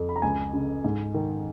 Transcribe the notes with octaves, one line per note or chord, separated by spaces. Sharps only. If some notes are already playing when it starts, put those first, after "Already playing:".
Already playing: F2
B5
A#5
C#2 G#5
C#3
G#2
D#3